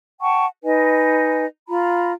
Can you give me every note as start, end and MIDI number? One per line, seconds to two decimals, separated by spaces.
0.20 0.46 78
0.20 0.46 79
0.20 0.46 81
0.20 0.46 85
0.63 1.45 63
0.63 1.45 71
0.63 1.45 75
0.63 1.45 80
1.69 2.11 65
1.69 2.11 82
1.69 2.11 83